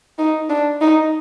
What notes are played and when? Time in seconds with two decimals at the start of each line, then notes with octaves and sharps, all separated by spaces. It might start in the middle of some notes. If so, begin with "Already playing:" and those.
0.18 D#4
0.49 D4
0.81 D#4